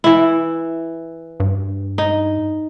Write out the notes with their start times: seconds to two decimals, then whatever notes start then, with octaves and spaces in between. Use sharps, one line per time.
0.04 E3 E4
1.40 G2
1.98 D#4